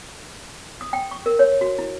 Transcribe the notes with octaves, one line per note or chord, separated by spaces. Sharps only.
D#6
G5
C#6
A#4
C#5
F#4
E4